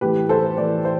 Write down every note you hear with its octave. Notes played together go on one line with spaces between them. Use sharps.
A2 E3 A3 G4 B4
A4 C5
A2 E3 A3 B4 D5
C5